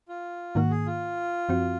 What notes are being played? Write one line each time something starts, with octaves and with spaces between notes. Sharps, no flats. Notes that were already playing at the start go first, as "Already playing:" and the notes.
F4
G#2 D#3 A#3 F#4
G#4
F4
F#2 F3 C4 F#4